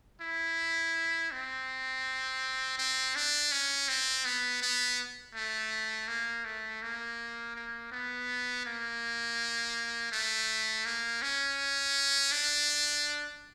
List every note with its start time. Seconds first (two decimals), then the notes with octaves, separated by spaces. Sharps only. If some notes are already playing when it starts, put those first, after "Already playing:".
0.22 E4
1.31 C4
2.78 C4
3.15 D4
3.52 C#4
3.88 C4
4.25 B3
4.62 B3
5.35 A3
6.08 A#3
6.45 A3
6.82 A#3
7.55 A#3
7.92 B3
8.66 A#3
10.12 A3
10.85 A#3
11.22 C#4
12.32 D4